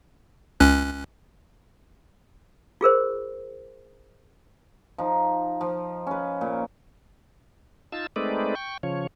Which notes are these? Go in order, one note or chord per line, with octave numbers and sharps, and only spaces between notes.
C#2 C#4 F#6
F4 G#4 A#4 C5
F3 D#4
F3
C#4 B4
A#2
D#4 F4 A5 E6
G#3 A3 C4 D#4 B4 D5
G5 C#6
C#3 F3 C#5